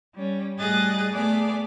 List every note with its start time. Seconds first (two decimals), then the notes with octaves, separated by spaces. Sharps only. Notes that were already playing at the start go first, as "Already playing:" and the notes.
0.14 G3 C#4
0.58 A2 G3 G#4 D#5 F#6 A6
1.13 A3 B3 G#4 D5